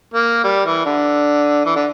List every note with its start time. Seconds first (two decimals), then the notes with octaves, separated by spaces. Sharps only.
0.14 A#3
0.44 G3
0.65 E3
0.86 D3
1.65 E3
1.76 D3